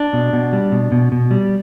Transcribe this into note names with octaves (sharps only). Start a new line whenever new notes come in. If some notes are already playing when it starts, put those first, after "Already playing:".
Already playing: D4
B2
B2
G3
B2
B2
B2
G3